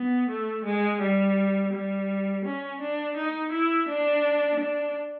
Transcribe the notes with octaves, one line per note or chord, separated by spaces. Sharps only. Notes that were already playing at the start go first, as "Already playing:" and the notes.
Already playing: B3
A3
G#3
G3
G3
C#4
D4
D#4
E4
D4
D4